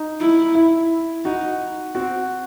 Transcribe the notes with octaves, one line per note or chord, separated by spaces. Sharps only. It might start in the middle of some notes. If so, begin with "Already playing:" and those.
Already playing: D#4
E4
E4
D#4 F#4
C4 F#4